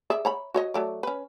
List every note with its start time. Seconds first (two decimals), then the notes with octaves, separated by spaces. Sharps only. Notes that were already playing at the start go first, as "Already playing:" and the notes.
0.10 G#4 D5 E5
0.25 C#5 A#5 B5
0.54 F#4 C#5 D#5
0.74 F#3 A3 D5
1.03 C#4 B4